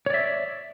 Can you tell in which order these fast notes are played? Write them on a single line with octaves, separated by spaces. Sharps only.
C#5 D5 E5